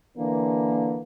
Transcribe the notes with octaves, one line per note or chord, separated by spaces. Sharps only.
D3 E3 A#3